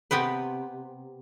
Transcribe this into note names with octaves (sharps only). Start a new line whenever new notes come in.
C3 B3 G4 B4